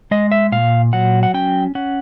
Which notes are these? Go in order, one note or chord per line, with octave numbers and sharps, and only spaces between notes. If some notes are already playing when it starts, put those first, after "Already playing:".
G#3 D#5
E5
A#2 F5
F#3 F#5
F#5
C#4 G5
C#4 F#5